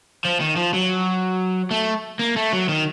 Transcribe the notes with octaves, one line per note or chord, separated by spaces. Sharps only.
F3
D#3
F3
F#3
A3
A#3
A3
F#3
D#3